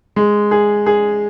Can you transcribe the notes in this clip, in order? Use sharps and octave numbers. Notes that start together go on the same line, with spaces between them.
G#3
G#4
G#4